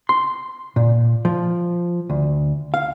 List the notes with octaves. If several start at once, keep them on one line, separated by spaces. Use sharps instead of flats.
C6
A#2
F3
D2
F5